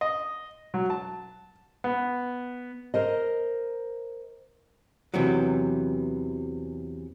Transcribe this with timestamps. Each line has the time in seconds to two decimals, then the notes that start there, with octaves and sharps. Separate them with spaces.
0.01 D#5
0.74 F#3
0.90 A5
1.84 B3
2.94 A#4 C5 D#5
5.14 E2 C3 E3 F#3